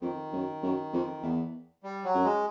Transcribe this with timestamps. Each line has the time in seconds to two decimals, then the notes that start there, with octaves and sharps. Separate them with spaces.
0.02 F2 D#3
0.33 F#2
0.63 F#2
0.93 F2
1.23 E2
1.83 G3
2.04 F#3
2.15 F#2
2.24 G#3